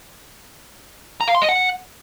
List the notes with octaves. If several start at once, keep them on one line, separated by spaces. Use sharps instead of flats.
A#5
F5
C6
D#5
F#5